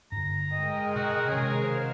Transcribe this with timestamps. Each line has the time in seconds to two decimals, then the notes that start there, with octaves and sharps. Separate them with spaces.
0.12 G2 D3 A#5
0.52 G#3 A#4 D#5 G5
0.95 B2 F#4
1.29 C3 D#3 C#4 G#4
1.57 F#4 A#4 C5 F5 F6